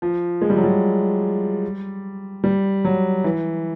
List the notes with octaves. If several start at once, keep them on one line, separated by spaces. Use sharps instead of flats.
F3
G#3
G3
F#3
G3
G3
F#3
E3